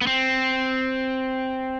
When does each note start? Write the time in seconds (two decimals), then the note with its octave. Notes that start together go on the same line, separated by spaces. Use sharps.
0.01 B3
0.07 C4